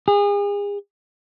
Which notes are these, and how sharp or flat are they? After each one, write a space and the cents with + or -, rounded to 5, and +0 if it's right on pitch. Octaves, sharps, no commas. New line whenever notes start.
G#4 -35